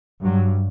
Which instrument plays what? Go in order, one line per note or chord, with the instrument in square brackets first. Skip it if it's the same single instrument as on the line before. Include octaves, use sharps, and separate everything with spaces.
[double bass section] G2 F#3